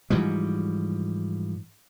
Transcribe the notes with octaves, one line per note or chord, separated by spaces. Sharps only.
G#2 E3 F3 G3